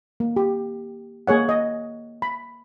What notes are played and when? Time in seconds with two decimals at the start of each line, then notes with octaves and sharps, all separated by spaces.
0.20 A#3
0.36 G4
1.27 A#3 G#4 C#5 F#5
1.49 D#5
2.22 B5